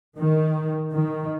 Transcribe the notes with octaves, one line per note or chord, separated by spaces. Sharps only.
D#3
D#3